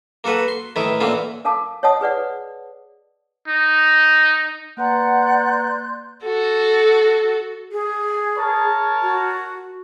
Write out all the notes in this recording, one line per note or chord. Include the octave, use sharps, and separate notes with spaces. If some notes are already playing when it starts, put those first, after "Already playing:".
A#3 F#4 A4 B4
C6
A2 D#3 E3 E4
A#2 D3 E3 C4 C#4
A4 A#4 F5 A5 D6
C#5 D#5 F#5 A5 D#6
G#4 B4 D5 F#5
D#4
A#3 B4 D5 F#5 A#5 C6 F#6 G6
F#4 A4
G#4
A#4 C#5 A5
F#4